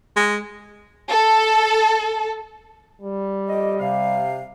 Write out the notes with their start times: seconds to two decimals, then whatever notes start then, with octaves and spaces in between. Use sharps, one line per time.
0.16 G#3
1.10 A4
3.02 G3
3.49 F2 G4 D#5
3.79 C3 F5